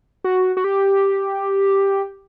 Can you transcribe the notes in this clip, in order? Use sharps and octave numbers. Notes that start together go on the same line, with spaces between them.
F#4
F#4
G4